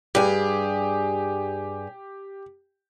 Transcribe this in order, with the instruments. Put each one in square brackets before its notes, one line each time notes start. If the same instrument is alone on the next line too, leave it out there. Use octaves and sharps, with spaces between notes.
[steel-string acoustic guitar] G2 G#4 G#5 [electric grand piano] G4